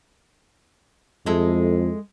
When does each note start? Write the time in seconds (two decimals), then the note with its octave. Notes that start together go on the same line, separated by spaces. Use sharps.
1.26 F2 G#3 E4 A4